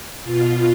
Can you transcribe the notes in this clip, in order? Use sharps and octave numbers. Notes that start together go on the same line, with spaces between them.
B2 F4